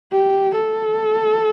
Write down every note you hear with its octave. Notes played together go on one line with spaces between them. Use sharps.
G4
A4